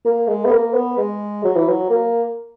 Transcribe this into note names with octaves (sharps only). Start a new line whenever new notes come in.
A#3
G#3
B3
A#3
B3
G#3
F#3
E3
F#3
A#3